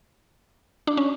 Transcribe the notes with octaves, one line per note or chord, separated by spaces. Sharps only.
D4
C#4